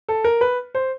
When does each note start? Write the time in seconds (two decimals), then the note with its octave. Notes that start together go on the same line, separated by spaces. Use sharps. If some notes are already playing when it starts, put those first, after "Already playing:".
0.09 A4
0.24 A#4
0.41 B4
0.75 C5